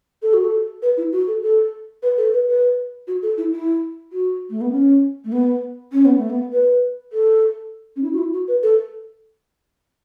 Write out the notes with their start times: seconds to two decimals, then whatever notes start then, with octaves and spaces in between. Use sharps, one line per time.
0.22 A4
0.34 F#4
0.45 A4
0.82 B4
0.97 E4
1.12 F#4
1.27 A4
1.42 A4
2.03 B4
2.18 A4
2.33 B4
2.48 B4
3.07 F#4
3.22 A4
3.38 E4
3.52 E4
4.13 F#4
4.50 A3
4.61 B3
4.72 C#4
5.24 A3
5.32 B3
5.92 C#4
6.05 B3
6.18 A3
6.30 B3
6.52 B4
7.13 A4
7.96 C#4
8.03 E4
8.13 F#4
8.18 E4
8.33 F#4
8.48 B4
8.63 A4